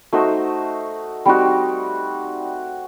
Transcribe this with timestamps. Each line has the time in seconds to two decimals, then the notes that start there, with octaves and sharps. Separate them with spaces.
0.13 A3 D#4 F#4 C5
1.26 G3 C4 D#4 F#4